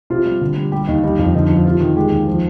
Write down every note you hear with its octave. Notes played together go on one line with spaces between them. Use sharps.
C3 F4
G3
D3
G3
G3 G4
D#2 D#4
G3 D#4
F2
D3 D#4
F3
C3 F4
D#3
G#3 G4
D#2
F3